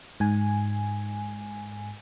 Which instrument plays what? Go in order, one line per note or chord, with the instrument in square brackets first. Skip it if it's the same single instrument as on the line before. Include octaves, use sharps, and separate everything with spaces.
[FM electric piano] G#2 G#5